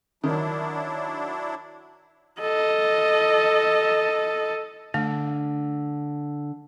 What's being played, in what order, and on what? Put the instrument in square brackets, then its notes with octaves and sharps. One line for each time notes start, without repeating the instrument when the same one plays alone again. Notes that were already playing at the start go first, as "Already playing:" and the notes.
[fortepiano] D#3 [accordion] F#3 D4 E4
[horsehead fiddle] A4 D#5
[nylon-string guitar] D3 [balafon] A3 D4